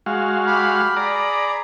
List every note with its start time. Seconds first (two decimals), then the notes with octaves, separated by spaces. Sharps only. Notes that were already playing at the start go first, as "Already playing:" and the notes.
0.06 G#3 F#4 F5
0.47 G4 B5 F6
0.97 G#4 D5 A#5 B5